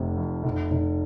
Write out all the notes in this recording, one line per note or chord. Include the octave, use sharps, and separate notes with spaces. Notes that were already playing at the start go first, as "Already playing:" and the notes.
Already playing: F1 C3 A3
F2
F1
F1